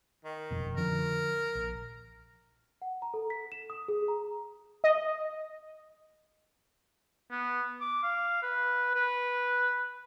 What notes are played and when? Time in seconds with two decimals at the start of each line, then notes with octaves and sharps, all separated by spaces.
0.25 D#3
0.51 F1 F2 B2
0.77 D3 F3 C#4 A#4
1.55 A#1
2.82 F#5
3.02 A#5
3.14 A4
3.30 B6
3.52 E7
3.70 D#6
3.88 G#4
4.08 A#5
4.84 D#5
7.31 B3
7.80 D6
8.03 F5
8.43 B4
8.94 B4